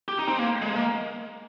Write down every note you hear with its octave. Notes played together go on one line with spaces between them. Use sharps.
G4
D#4
C4
A#3
G#3
A#3